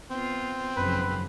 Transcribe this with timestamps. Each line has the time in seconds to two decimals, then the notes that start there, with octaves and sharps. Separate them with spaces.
0.10 B3 C4 F4
0.77 G#1 F#2 C#3 F3 F#3 B4 B5